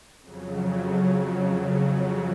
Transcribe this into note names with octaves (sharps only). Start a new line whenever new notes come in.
F2 C#3 F#3